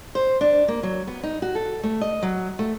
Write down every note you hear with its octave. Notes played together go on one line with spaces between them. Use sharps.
C5
D4
A#3
F#3
B3
D#4
F#4
A4
A3
D#5
F#3
A3